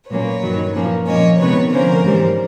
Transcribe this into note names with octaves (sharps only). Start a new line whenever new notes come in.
A#2 F#3 A#3 C#4 B4 C#5
G2 D#3 F#3
A#2 F3 A#3 C#4
A#2 F3 A#3 C#4 C#5 D#5
C3 D#3 G#3 B3 B4 C#5
D3 F3 A#3 C#4 A#4 C5
G#2 E3 G3